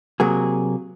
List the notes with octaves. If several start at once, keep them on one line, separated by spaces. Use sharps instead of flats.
C3 F#3 A#3 G#4